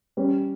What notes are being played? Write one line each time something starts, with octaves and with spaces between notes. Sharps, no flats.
G3 C#4